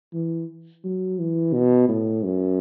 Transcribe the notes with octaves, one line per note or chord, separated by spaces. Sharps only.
E3
F#3
E3
B2
A2
F#2